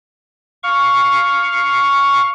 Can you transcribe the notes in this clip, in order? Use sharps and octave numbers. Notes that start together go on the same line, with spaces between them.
F5 C#6